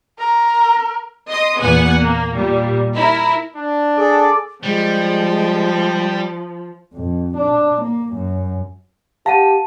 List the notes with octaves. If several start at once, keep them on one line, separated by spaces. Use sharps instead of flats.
A#4 A#5
D#5 C6 D#6
E2 A#2 B3 F#5 G#5
A#3
A#2 G3
E4 A#4
D4
G#4 A4 D5
F3 G3 G#3
F2
D4
A#3
F#2
G4 F5 F#5 A5 D#7